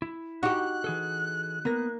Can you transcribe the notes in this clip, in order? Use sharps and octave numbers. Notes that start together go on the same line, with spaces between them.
E4
D#4 F#4 G4 F#6
E3 G#4 A4
A#3 B3 A#6